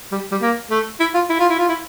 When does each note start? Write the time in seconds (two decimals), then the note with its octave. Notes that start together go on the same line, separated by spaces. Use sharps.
0.12 G3
0.32 G3
0.41 A#3
0.70 A3
1.00 E4
1.14 F4
1.29 E4
1.39 F4
1.49 E4
1.59 F4
1.69 E4